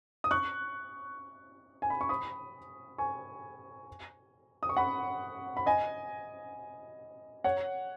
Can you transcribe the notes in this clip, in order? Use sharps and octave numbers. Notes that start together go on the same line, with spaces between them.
D#6
C#6 F#6
G#5
B5
C#6
B5 D#6
G#5 C#6
D#6
C#6
F#5 B5
B5
D#5 G#5
C#5 F#5